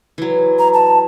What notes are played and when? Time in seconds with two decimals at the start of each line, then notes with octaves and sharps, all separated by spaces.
0.18 E3 F#3
0.59 A#5
0.73 A5